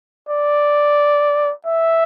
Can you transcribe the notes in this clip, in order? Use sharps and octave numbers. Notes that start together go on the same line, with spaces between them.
D5
E5